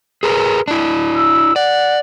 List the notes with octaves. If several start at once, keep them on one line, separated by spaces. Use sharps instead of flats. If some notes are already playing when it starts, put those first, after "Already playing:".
G#4 A#4 B4
D4 E4
E6
D5 F#5